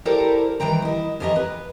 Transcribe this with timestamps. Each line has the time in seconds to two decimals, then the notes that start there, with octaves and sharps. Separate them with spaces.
0.05 E4 G4 A4 A#4 C5 D5
0.60 D#3 E3 G3 G5 A#5
0.82 E4 D#5
1.20 F2 E3 G4 D#5 E5 A#5
1.36 B4